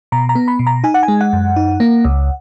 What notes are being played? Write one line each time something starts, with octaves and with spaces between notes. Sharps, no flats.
B2 A#5
A#5
B3
B5
B2
A#5
D#4 G#5
F#5
G#5
G#3
F#5
F#2
D#4
A#3
C#2